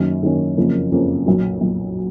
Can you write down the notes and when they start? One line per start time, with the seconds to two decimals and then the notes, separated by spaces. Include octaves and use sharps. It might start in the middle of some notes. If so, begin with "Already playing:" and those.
Already playing: F#2 D#3 F#3 A#3 C#4
0.22 F#2 D#3 F#3 A#3 C#4
0.57 F#1 F2 C#3 F3 A#3
0.91 F#1 F2 C#3 F3 A#3
1.26 B1 A#2 F#3
1.61 B1 A#2 F#3